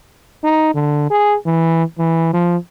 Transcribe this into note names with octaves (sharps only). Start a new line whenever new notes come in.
D#4
D3
G#4
E3
E3
F3